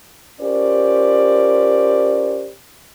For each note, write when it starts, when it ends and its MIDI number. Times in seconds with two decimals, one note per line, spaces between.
0.40 2.47 61
0.40 2.47 65
0.40 2.47 67
0.40 2.47 70
0.40 2.47 72
0.40 2.47 74